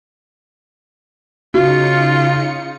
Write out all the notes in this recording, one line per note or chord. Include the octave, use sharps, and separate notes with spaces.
C#3 D#4 F4 F#4 C#7